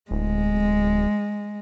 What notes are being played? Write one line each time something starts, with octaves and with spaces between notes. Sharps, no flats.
D1 G#3